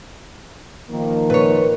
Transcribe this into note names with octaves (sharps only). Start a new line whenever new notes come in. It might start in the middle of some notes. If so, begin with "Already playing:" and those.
D#3 F3 A#3
A#2 B4 C#5